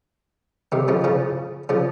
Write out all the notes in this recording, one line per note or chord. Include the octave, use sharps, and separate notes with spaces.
C3 D#3
C#3 F3
C#3 F3
C#3 F3